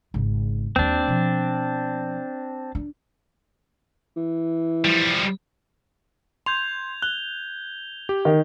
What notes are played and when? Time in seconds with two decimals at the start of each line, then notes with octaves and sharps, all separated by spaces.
0.14 G#1 C#3
0.76 D#2 G3 C4 D4
1.08 B2 F3
2.75 D4
4.17 E3
4.85 F3 G3
6.46 C6 G6 G#6 F7
7.02 F#6 G7
8.09 G4
8.25 D#3